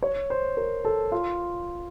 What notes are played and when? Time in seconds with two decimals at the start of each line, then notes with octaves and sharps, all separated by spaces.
0.02 C#5
0.30 C5
0.57 A#4
0.85 A4
1.12 F4